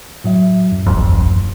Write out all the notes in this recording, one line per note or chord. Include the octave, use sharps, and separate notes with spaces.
A2 F#3 E5
F#2
D#1 A1 F2